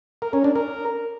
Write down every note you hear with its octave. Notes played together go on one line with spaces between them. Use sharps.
A#4
C#4
D4
A#4